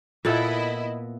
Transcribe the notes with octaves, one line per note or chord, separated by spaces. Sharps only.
A#2 B3 E4 A4 D#5 E5